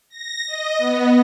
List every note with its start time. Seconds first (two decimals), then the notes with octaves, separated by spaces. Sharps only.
0.10 A#6
0.47 D#5
0.78 B3